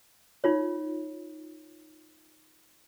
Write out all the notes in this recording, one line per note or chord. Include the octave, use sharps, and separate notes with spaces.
D#4 F4 C#5